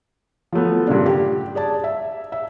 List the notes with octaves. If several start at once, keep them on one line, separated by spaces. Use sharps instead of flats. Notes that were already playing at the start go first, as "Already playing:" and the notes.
F3 F#3 A3 B3
G2 A#2 C#3 D4
G4
G#4 D5 A5
E5
E5